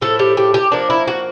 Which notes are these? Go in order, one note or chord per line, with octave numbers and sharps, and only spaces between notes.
A2 F3 A3 A4
G4
G4
G4
F3 A#3 D4
E4
F#4